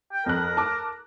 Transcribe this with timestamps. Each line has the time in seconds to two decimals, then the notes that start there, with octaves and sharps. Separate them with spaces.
0.13 G5
0.26 F2 A#4 F#6
0.57 A5 D6